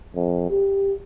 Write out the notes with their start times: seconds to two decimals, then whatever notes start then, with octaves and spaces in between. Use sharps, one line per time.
0.16 F2
0.50 G4